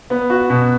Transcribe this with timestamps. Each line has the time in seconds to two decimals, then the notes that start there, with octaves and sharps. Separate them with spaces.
0.10 B3
0.30 F#4
0.50 B2